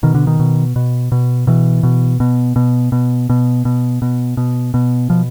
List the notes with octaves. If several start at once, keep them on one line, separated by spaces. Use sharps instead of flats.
B2 D#3
D3
D#3
B2
B2
B2
B2 E3
B2
B2
B2
B2
B2
B2
B2
B2
B2
B2 F3